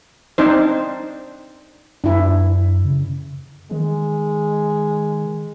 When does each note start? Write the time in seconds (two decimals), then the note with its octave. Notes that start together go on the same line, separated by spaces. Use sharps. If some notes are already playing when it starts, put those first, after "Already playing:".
0.38 C4 D4 D#4 C5
2.04 F#2 D4 E4
2.85 C#3
3.71 D#3 G#3